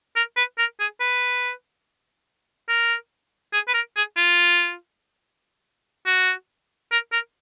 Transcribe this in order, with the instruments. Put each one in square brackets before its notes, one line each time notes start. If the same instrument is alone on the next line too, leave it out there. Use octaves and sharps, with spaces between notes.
[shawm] A#4
B4
A#4
G#4
B4
A#4
G#4
B4
A#4
G#4
F4
F#4
A#4
A#4